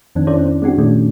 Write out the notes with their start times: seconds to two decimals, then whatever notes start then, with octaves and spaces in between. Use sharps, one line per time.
0.15 F2 D#3 C4 D4
0.27 C#4 E4 A4 C5 D5
0.39 C4
0.62 G#3 C4 D4 F#4 G4
0.78 A#2 D#3 G#3 A3 C#4 D4